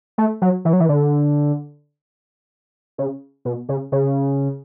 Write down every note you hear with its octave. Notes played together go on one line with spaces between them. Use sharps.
A3
F#3
E3
F#3
E3
D3
C#3
B2
C#3
C#3